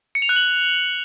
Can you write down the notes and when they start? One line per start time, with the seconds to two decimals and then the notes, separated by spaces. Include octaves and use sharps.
0.15 C#7
0.22 F7
0.29 F#6
0.36 F#7